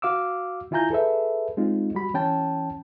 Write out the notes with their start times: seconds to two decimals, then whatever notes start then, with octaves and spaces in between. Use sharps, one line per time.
0.02 F#4 F5 D6 E6
0.71 D#3 E4 F4 G#5 A#5 G6
0.90 G#4 A4 B4 E5
1.57 G#3 C4 D#4 F4
1.95 G3 F#4 B5
2.14 E3 C#4 G5 A5